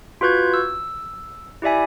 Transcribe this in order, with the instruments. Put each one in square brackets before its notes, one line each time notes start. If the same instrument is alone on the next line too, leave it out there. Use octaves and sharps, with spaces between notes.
[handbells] F4 F#4 B4 C#6 G6 G#6
E6
E4 G4 D5 E5 G#5